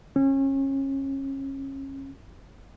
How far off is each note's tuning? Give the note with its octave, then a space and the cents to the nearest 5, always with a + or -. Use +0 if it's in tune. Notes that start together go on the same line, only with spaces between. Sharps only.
C#4 -30